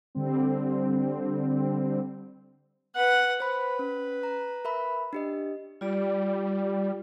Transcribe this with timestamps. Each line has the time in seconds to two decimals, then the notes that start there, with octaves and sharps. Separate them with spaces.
0.15 D3 G3 C4
2.95 B4 F#5
3.40 B4 C5 B5
3.79 C#4
4.23 A#5
4.65 A#4 E5 B5
5.13 D4 G4 D#5
5.81 G3 F4 G4 D5